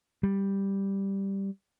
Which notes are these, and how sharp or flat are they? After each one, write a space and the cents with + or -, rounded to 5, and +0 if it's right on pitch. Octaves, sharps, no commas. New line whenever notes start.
G3 +0